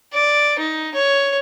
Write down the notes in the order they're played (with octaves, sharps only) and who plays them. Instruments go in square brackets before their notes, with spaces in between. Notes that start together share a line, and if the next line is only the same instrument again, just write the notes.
[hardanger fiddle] D5
D#4
C#5